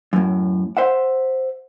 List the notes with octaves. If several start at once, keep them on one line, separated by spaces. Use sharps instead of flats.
F#2 A2
C5 E5 F#5